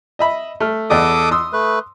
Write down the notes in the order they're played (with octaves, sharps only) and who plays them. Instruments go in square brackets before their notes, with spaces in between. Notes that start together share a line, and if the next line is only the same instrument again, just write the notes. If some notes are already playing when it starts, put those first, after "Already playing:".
[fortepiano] D#5 E5 B5
A3 F6
[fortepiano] E2 D5 D#5 [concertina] A4 D6 D#6
[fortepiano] C6 D#6 E6
[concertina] A3 B4